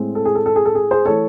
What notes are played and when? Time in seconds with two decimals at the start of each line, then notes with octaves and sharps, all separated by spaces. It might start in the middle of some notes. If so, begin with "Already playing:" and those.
Already playing: A2 G#3 C4
0.15 A4
0.25 G#4
0.35 A4
0.46 A4
0.56 G#4
0.65 A4
0.75 G#4
0.91 G#4 C5
1.05 E3 A3 A4 C#5